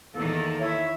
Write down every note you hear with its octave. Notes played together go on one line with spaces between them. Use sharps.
E2 D#3 A#3 A4
E4 C#5 E5